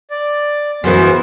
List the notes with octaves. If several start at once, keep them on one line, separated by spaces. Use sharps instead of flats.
D5
F#2 C#3 E3 B3 C5